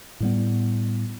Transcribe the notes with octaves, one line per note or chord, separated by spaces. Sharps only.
A2 G3 B3